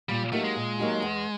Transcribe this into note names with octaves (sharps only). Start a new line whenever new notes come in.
A#2 G3
F#3 A3 A#3 D#4 G4
G#3
A#2
F#3 A#3 D#4 G4
E2